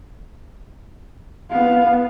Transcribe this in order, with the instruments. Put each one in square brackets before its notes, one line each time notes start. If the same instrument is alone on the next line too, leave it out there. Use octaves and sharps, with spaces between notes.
[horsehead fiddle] B3 F5